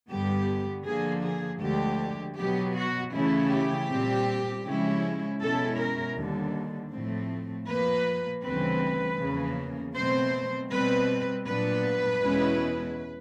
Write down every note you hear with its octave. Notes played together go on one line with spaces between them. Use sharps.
G2 D3 G3 B3 G4
D3 F3 A#3 G#4
G#4
D2 D3 F3 G#3 G4
B2 F#3 B3 G4
F#4
C#3 E3 A3 C#4 E4
G4
A#2 G3 C4
C#3 F3 G#3 C#4 E4
B2 G#3 C#4 E4 A4
A#4
D#2 D3 G3
A2 F3 A3 C4
A#2 F3 A#3 B4
D2 C#3 E3 G3 C4 B4
E2 C#3 F3 A#3
B2 F#3 A3 C4 C5
B2 G3 C4 B4
A#2 F#3 B3 D4 B4
E2 B2 G#3 C#4 E4